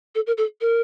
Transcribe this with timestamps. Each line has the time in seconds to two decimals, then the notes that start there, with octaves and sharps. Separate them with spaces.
0.15 A4
0.27 A#4
0.38 A4
0.61 A#4